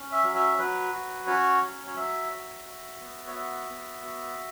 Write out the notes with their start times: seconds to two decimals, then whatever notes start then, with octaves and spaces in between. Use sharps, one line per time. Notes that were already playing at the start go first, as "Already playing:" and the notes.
Already playing: C#4
0.12 E5
0.24 F#3
0.35 E5
0.58 F#3 B4
0.92 F#4
1.27 C#4 C#5
1.62 F#3
1.87 C#5
1.96 F#3 E5
2.31 F#4
2.66 F#4
3.00 B3
3.27 C#5
3.35 F#4 E5
3.70 B3
4.04 F#4